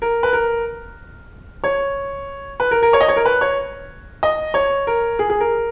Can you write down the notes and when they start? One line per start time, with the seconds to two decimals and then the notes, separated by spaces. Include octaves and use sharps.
0.02 A#4
0.23 B4
0.33 A#4
1.64 C#5
2.60 B4
2.71 A#4
2.82 A#4
2.93 C#5
3.01 D#5
3.08 C#5
3.16 A#4
3.26 B4
3.41 C#5
4.23 D#5
4.54 C#5
4.87 A#4
5.19 G#4
5.30 G#4
5.40 A#4